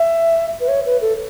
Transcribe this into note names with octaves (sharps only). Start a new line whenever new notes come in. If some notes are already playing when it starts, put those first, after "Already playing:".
Already playing: E5
B4
C#5
B4
A4